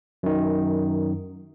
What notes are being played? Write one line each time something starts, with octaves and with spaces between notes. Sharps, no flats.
F#2 D#3